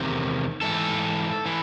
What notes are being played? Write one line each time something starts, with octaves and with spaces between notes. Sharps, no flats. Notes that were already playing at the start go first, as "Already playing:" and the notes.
Already playing: E2 C3 D#3
G#2 E3 A4
E3